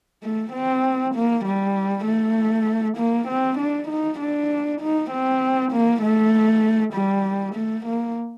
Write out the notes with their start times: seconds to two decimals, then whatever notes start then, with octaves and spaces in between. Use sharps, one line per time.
0.23 A3
0.53 C4
1.15 A#3
1.45 G3
2.05 A3
2.97 A#3
3.28 C4
3.58 D4
3.88 D#4
4.19 D4
4.81 D#4
5.10 C4
5.72 A#3
6.02 A3
6.94 G3
7.55 A3
7.86 A#3